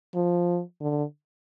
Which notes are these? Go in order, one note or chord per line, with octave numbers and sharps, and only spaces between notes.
F3
D3